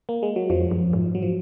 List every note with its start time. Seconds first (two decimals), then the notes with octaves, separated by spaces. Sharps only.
0.09 A#3
0.23 G#3
0.36 F#3
0.50 F2 F3
0.71 F#2
0.93 G#2
1.15 F#3
1.23 F3